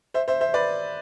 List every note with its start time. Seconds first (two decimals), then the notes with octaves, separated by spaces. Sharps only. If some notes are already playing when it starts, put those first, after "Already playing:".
0.14 C5 E5
0.28 C5 E5
0.41 C5 E5
0.54 B4 D5